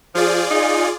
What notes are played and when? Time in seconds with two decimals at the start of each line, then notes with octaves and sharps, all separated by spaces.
0.15 F3 F4 G#4 D5
0.51 D#4